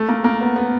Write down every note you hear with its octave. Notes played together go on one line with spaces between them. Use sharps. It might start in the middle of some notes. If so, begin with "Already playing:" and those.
Already playing: A3
A#3
A#3
B3
B3